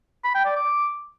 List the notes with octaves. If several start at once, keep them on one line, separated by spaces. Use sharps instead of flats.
B5
G5
D5
D6